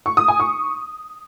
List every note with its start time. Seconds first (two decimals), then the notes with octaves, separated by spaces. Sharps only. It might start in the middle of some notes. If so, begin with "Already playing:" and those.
0.06 C#6
0.17 D#6
0.28 G#5
0.40 C#6